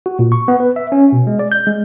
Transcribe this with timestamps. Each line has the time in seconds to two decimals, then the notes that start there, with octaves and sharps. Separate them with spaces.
0.06 F#4
0.19 A#2
0.32 C#6
0.48 B3
0.60 B4
0.76 E5
0.92 C#4
1.12 B2
1.27 G#3
1.39 D5
1.52 G6
1.67 G#3